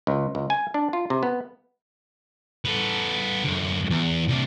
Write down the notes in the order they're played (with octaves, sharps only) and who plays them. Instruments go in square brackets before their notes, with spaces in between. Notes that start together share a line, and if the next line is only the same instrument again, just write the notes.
[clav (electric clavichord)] C#2
C#2
G#5
D4
F4
C3
B3
[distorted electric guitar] B3 A4
F#2 D3
E2
C2 D4